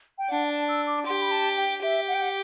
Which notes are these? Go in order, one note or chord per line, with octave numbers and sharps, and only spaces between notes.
G5
D4 F#5
A5
E6
D6
G4 C6
B5
A5
G5
G4 E5
F#5
G5
F#5